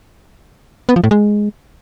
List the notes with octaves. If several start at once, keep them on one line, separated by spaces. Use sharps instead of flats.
B3
F3
A2
G#3